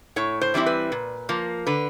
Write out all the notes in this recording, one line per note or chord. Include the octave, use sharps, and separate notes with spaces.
A2 C#5
C5
E3 G3 C4 E4 C5
B4
A#2
F3 A#3
D3 B4